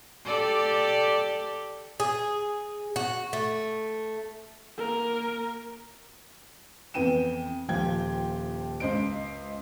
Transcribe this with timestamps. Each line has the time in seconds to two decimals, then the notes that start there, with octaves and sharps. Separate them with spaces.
0.25 G4 A4 D5
2.00 G#4
2.96 F#4
3.33 A3
4.78 A#3 A#4
6.94 F2 E3 B3 G5 D#7 E7
7.69 D#1 F3 G5 G#6
8.80 C#2 C#4 C5 D#5 D7